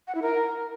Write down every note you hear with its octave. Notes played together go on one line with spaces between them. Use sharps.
F#5
E4
A#4